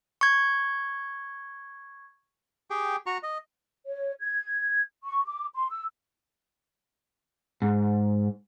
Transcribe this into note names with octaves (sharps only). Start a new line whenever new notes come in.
C#6 G#6
G4 G#4 G5
F#4 A#5 C#6
D#5
C#5
G#6
C#6
D6
C6
E6
G#2